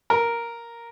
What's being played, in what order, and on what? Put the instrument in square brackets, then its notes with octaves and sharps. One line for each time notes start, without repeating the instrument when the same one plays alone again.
[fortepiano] A#4